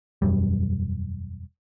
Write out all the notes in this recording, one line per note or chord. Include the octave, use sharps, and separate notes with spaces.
E1 F#2 G3